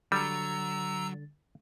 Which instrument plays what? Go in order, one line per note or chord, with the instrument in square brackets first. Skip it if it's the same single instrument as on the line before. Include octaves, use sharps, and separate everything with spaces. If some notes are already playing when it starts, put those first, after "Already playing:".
[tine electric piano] D3 A6 [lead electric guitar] F#3 [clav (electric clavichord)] G3 [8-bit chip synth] A#5 E6